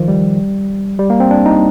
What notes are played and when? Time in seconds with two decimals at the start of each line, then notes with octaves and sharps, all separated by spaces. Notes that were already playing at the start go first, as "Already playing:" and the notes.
Already playing: D#3 F3
0.08 G3
0.99 G3
1.10 A#3
1.20 C4
1.31 D4
1.46 D#4